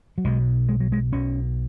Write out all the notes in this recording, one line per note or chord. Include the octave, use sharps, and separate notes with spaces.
F#3
B1 B2 G#3
G#3
F#3
G#3
B1 B2 C#4